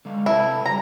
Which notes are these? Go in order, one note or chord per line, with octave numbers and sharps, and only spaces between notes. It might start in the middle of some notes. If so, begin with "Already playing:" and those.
D3 G#3 F5
C3 E4 A4 B4
C#3 G3 A#5